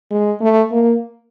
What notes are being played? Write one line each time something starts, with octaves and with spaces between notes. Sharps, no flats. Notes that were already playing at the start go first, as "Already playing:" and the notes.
G#3
A3
A#3